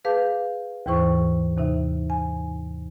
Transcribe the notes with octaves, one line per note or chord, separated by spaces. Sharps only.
G#4 B4 F5 A5 D6 G6
D#2 G#2 E3 E4 C5 C#6
D#2 C3 D#4 E5
G#5